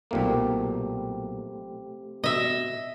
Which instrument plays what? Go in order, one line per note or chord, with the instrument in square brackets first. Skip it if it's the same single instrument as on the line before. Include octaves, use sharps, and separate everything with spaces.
[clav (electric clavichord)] B1 A#2 A#3 [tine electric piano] A3 C4 G4
[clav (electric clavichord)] B2 [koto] D#5 E5